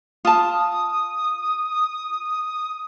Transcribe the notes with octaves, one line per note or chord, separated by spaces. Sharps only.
F4 A5 D#6